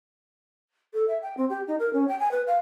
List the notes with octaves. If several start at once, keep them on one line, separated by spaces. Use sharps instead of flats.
A4
E5
G5
C4
G4
D#4
A#4
C#4
G5
G#5
B4
F5